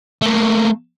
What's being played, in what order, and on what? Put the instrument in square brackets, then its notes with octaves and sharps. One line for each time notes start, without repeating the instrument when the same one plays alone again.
[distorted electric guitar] A3 A#3